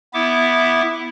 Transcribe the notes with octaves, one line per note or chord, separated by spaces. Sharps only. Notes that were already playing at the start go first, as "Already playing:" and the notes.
B3 E4 E5 D6